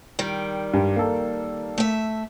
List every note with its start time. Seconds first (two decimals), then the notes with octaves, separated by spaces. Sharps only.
0.19 D#3 G3
0.73 G2
0.96 A#3 A4
1.78 A3 E5